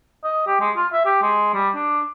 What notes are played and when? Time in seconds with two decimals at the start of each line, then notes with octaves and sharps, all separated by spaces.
0.24 D#5
0.47 G4
0.60 G#3
0.76 F4
0.92 E5
1.06 G4
1.22 G#3
1.54 G3
1.75 D4